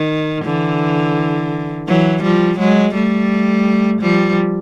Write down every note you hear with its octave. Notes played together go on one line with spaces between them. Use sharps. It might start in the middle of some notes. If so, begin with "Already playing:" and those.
Already playing: D#3
D3 E3
E3 F#3
F3 G3
F#3 G#3
G3 A3
F3 G3